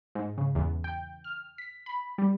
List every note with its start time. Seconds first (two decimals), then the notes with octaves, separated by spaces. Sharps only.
0.15 G#2
0.38 C#3
0.55 E2
0.84 G5
1.24 F6
1.58 B6
1.86 B5
2.18 G3